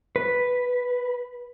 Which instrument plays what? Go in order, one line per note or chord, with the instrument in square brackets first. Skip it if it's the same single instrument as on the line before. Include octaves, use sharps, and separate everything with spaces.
[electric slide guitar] B4